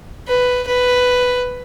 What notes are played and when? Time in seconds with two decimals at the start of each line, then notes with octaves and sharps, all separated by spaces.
0.28 B4
0.67 B4